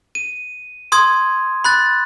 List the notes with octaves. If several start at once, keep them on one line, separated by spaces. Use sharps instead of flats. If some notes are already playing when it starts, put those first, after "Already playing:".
D#7
C6 D#6 G#6
B5 F#6 A6